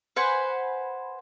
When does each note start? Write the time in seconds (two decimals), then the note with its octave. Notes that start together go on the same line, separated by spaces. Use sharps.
0.16 B4 C5 F#5 G#5